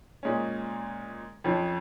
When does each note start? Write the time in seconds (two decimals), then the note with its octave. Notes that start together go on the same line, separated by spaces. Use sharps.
0.23 A#2 G#3 C#4
1.44 F2 F3 C#4